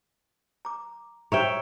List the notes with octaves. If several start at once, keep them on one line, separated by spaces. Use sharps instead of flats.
A#5 D6
G4 C5 C#5 E5 G5 A#5